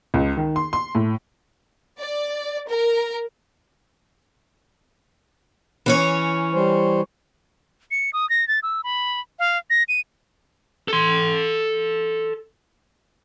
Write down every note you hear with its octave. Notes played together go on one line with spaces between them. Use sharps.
C#2
D#3
C6
C6
A2
D5
A#4
E3 C#4 C#5
G3 C5
C#7
D#6
A#6
A6
E6
B5
F5
A#6
D#7
A4 C6